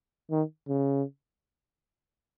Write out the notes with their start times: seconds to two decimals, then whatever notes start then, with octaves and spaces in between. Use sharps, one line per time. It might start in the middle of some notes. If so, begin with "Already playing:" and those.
0.31 D#3
0.69 C#3